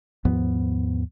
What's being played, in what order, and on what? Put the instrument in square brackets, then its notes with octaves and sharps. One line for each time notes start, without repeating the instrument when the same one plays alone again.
[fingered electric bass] D#2 G#2 F3 B3